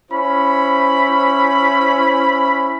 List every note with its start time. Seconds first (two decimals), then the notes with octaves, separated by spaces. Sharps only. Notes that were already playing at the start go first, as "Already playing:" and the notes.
0.11 C#4 E4 C5 B5